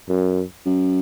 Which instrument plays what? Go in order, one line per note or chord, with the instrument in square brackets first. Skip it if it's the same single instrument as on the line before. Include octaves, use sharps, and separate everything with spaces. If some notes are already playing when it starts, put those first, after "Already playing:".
[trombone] F#2
[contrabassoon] F#2